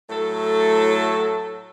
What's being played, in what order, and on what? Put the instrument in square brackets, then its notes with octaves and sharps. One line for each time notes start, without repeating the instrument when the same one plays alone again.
[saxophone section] A2 F#3 A3 A4